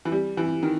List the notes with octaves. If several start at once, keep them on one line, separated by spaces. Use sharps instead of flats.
E3
G3
E3
D#3